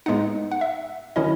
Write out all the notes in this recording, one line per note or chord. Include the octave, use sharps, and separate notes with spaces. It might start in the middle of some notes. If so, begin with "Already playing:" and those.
A2 G#3 B3 D#4 F#5
F#5
E5
D#3 F#3 C#4 E4 D#5